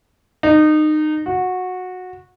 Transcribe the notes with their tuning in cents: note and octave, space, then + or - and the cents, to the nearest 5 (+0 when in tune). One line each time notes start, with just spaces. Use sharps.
D#4 -25
F#4 -15